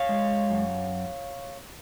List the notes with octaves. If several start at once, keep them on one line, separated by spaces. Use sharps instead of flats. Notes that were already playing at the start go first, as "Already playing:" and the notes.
Already playing: C#5 F5
G#3
F#2